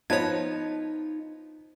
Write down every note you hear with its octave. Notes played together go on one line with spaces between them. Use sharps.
F3 B3 D#4 C#5 D#5 A5 G#6